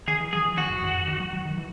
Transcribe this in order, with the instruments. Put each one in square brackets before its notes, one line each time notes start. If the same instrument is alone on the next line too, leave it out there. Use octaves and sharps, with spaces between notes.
[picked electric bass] D#3 [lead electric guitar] G#4
[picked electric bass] E3
[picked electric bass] F#3 [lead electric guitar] G#4
[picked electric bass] E3
[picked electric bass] D#3 [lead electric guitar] F#4
[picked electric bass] G#2
F#2
F#2
D#3
F#3
F#3
D#3
E3